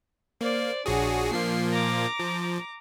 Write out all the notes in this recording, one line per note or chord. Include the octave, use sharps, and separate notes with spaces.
A#3 C5 D5
A#1 D4 F#4 G#4 C#5
A#2 F3 A#3 C7
A#5 D6
F3